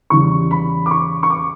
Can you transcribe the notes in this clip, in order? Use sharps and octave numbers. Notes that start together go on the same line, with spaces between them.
E2 C#3 E3 G3 C#6
B5
D6
C#6
C#6
D6